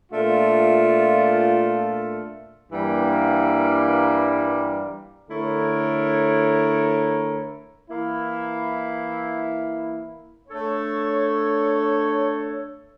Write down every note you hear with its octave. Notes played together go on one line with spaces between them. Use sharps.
A#2 A3 D4 F4
G2 E3 G3 A#3
D3 A3 E4 A#4 C#5
E3 A#3 E4
A3 D4 A4 C#5